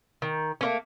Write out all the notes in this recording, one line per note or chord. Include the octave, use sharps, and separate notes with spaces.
D#3
A3 A#3 C#4